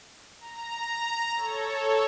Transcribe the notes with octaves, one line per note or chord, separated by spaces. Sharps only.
A#5
A4 C#5